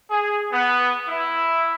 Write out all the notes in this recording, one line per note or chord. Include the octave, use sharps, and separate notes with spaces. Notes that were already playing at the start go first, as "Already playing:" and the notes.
G#4
B3
E4